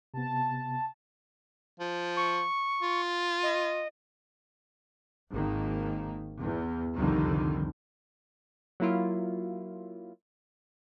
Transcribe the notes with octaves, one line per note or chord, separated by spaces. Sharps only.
C3 B3 A5
F3
C#6
F4
D#5
G#1 D#3 A#3
E2
C2 F2 D3 D#3 G3
F#3 A#3 E4 F4